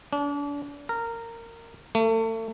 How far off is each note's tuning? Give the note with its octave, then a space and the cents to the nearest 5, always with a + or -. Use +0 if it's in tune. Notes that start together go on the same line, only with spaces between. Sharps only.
D4 -35
A#4 -15
A3 +35